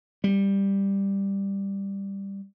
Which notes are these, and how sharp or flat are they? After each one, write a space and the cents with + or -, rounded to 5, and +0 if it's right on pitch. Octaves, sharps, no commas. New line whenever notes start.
G3 +10